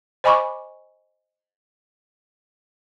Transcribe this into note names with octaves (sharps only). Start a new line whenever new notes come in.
C5 D#5 G#5 B5 C#6 D6